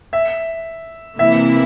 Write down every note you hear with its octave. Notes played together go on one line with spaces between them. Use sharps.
E5
C3 E3 A#3 E4 E5